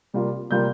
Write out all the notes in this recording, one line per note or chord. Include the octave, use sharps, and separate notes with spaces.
C3 G3 A#3 F4
C3 G3 A#3 F4 G6